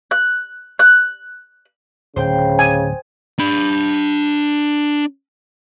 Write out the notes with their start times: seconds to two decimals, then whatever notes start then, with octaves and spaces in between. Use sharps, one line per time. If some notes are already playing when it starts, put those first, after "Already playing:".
0.11 F#6
0.79 F#6
2.16 D1 C#3 C5 G5
2.59 G#5
3.39 D4 B5